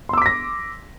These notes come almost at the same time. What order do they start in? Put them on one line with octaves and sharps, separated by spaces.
C6 E6 D6 B6 A#6